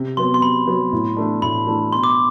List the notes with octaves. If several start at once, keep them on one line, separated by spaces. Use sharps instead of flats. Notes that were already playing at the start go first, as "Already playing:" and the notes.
Already playing: C3
F#3 B3 C6
C6
C3 B5
F#3 B3
A2
E3 A3 D4
A2 B5
E3 A3 D4
B2 C6
D6